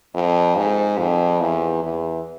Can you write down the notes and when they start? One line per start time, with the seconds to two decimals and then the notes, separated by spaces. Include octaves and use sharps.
0.15 F2
0.56 G#2
0.98 F2
1.41 E2
1.83 E2